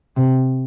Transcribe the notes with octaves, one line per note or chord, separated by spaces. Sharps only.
C3